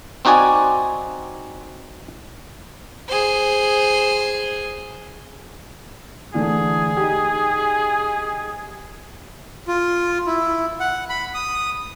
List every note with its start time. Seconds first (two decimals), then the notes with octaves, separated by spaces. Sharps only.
0.25 C4 D#4 F#4 D5 G#5
3.08 G#4 C5
6.34 D3 E3 A3 G#4
6.97 D#4 G4
9.68 F4
10.27 E4
10.80 F#5
11.09 B5
11.34 D#6